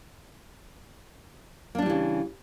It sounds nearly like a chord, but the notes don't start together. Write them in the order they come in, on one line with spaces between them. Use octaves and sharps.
A#3 D4 G3 E3 C#3